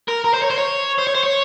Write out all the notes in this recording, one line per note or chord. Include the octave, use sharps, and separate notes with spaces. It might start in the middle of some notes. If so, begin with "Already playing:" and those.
A#4
A#4
C5
C#5
C5
C#5
C5
C#5
C5
C#5